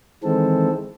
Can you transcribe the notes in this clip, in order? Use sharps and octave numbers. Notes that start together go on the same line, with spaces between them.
D#3 E3 G#3 C4 A4